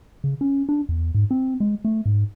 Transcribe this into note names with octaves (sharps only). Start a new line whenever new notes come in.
C#3
C#4
D4
E2
G#2
C4
G#3
A3
G#2